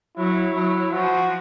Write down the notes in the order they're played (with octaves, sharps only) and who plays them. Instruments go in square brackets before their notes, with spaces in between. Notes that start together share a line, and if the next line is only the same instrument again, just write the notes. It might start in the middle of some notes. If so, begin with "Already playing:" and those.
[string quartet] F#3 [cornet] E4
[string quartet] F#3 [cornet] E4
[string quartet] F3 [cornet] F#4